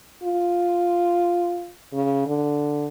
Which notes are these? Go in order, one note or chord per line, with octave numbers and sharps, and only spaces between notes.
F4
C#3
D3